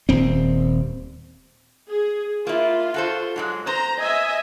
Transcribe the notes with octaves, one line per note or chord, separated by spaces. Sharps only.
D#1 C4
G#4
A#3 E4 F4
F#4 A4 C5
G#2 F#3 G#3
C5 A#5
D#5 E5 G#5